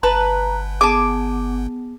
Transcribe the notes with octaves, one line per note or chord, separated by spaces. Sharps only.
G1 B4 A5 A#5
B3 G#4 A5 D6